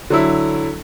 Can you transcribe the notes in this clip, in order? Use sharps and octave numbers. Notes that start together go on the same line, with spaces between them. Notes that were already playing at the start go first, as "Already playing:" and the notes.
D3 F#3 E4